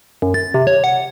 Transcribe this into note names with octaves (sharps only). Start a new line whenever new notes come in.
F#2
A6
C3
C#5
F#5